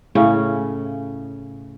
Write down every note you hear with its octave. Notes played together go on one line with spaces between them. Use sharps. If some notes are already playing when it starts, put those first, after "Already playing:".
A2 C#3 C#4